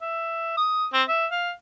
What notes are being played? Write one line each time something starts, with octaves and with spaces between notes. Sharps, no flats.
E5
D#6
C4
E5
F5